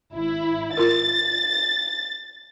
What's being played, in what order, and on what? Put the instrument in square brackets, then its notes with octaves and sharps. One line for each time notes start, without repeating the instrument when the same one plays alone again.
[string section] G#1 E4
[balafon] F4 A#4 [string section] A6